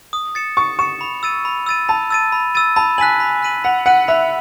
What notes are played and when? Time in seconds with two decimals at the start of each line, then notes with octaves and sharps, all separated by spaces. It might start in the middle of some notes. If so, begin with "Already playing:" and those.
0.13 D#6
0.35 A6 C#7 E7
0.57 C#6 D#6
0.79 C#6 A6 C#7 E7
1.01 B5
1.23 E6 A6 D#7
1.45 B5
1.66 E6 A6 D#7
1.89 A5 B5
2.10 E6 A6 D#7
2.32 B5
2.55 E6 A6 D#7
2.76 A5 B5
2.98 G#5 F#6 B6 D#7 F#7
3.20 B5
3.42 F#6 B6 D#7 F#7
3.64 F#5 B5
3.86 F#5 F#6 B6 D#7 F#7
4.08 E5 B5